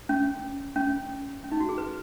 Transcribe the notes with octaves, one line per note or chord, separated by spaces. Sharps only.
C#4
C#4
C#4
D#4
F#4
G#4
B4